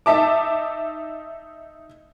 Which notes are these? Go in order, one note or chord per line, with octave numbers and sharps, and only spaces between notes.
D#4 E5 A5 D6